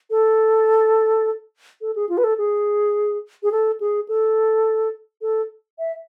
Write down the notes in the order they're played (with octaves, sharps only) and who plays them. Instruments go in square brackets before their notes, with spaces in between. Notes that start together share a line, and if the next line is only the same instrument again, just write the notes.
[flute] A4
A4
G#4
F4
B4
A4
G#4
G#4
A4
G#4
A4
A4
E5